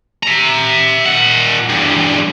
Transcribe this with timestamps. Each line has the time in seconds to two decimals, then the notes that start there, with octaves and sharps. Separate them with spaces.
0.23 E5 A#5
1.06 A#2 F#5
1.69 E2 G2